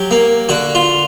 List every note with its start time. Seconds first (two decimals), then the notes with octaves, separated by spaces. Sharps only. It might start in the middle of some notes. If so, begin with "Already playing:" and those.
Already playing: F#3 G4
0.11 A#3
0.49 D3 F#4
0.75 F4